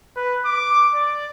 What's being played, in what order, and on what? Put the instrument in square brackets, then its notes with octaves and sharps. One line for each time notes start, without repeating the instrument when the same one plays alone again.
[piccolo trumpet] B4
D6
D5